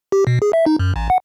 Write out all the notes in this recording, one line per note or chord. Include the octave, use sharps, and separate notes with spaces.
G4
B2
G#4
E5
D#4
F#2
A1
F#5